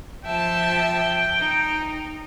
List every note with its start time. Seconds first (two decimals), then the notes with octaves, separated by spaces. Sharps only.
0.25 F3 E5 G5 A5
1.37 D#4